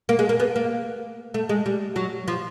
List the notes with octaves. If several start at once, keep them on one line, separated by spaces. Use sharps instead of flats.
A#3
G#3
A#3
B3
A#3
A3
G#3
G3
F#3
F3